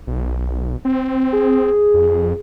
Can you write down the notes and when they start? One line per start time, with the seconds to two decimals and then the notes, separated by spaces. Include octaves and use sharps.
0.07 B1
0.85 C4
1.33 G#4
1.94 F2